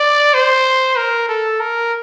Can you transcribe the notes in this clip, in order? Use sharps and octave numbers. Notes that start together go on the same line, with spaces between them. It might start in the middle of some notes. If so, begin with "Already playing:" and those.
Already playing: D5
C5
A#4
A4
A#4